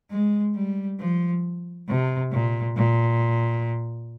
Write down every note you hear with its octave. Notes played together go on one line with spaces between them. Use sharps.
G#3
G3
F3
C3
A#2
A#2